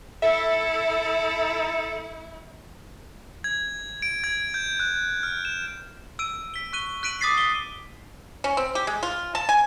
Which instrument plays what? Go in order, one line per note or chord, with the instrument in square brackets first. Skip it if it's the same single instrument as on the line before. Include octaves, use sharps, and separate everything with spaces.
[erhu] E4 [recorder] A4 [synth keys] E5
[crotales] G#6
D7
G#6
G6
F#6
F6
E7
[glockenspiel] E6 D7 D#7
B6 G7
C#6 F#6 D#7 G7
F#6 B6 D7 D#7 F#7
D6 D#6 F#6 A6 B6 C7
G7
[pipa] C#4
C4
G4
G#3
F4
A5
G#5